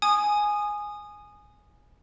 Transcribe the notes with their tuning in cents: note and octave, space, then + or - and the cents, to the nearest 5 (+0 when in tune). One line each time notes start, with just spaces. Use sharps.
G#5 +0 D#6 -20